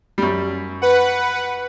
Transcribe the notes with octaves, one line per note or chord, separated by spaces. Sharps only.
F#2 G3
B4 F#5